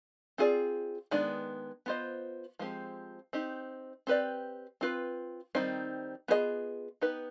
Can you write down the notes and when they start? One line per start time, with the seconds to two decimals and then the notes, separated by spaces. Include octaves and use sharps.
0.38 C4 F4 G#4 D5
1.11 D#3 G#3 B3 D4
1.86 B3 F4 C5 D#5
2.59 F3 G#3 C4 G4
3.33 C4 D#4 G4
4.07 C4 G4 B4 D5
4.81 C4 F4 B4
5.55 D#3 G3 C4 D#4
6.28 B3 F4 G#4 C5 D#5
7.01 B3 D#4 G4 B4